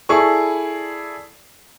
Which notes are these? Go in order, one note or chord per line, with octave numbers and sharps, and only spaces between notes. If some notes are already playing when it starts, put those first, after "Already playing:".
E4 G#4 A4 D5 C#6